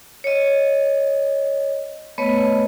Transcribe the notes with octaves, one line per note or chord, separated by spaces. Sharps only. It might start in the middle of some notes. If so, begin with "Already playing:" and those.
C#5 D#5
A3 B3 B4 C#5 D#5